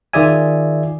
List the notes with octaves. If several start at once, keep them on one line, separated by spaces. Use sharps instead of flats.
D#3 F4 G#4 D5 E5 G#5